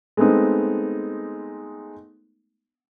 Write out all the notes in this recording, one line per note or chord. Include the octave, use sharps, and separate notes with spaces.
G#3 A3 B3 C4 D#4